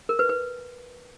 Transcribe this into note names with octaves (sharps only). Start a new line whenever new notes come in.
A#4
B4
B4